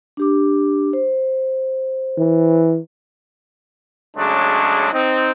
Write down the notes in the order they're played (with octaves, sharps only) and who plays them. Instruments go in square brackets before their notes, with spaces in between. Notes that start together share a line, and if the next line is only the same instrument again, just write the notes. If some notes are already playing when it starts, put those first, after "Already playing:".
[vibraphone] D4 G4 D6
C5
[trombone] E3
[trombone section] C#3 F#3 G#3 A3 D4
C4 D#4